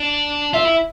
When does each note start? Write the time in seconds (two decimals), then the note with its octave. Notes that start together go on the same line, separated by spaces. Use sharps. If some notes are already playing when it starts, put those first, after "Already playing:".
Already playing: D4
0.54 F4 E5
0.65 E4